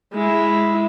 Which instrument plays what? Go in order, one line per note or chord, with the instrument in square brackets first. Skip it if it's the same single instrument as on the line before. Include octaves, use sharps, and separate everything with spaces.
[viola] G#3 E4